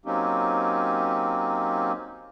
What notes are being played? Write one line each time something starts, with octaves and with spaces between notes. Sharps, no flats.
F#3 A#3 C4 C#4 D#4 G4